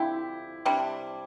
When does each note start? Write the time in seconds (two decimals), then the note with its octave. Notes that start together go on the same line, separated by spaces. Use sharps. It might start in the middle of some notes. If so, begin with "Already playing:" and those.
Already playing: D3 F3 C4 E4 G4
0.65 C3 G3 D4